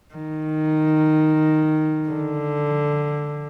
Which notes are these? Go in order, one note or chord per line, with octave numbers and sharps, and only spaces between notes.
D#3
D3